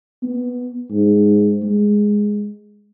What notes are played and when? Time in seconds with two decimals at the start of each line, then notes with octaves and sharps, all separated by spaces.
0.23 B3
0.91 G#2
1.63 G#3